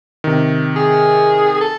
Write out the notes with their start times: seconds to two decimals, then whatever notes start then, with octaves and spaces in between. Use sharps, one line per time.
0.24 C3 D#3
0.76 G#4
1.61 A4